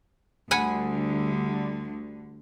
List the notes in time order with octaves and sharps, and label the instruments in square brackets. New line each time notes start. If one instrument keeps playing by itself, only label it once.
[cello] D2 [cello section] D3 G3 [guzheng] F#5 G#5 B5